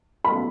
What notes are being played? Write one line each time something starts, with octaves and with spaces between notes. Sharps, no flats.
B5